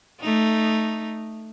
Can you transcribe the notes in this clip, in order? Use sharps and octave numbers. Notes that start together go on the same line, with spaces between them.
A3 D#4